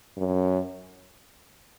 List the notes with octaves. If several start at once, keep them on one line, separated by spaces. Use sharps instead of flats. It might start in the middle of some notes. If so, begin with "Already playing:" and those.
F#2